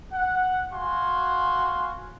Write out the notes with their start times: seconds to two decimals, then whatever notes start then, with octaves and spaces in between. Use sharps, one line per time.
0.12 F#5
0.73 F#4 F5 G#5 C6